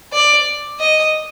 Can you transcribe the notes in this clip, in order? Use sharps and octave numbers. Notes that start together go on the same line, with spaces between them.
D5
D#5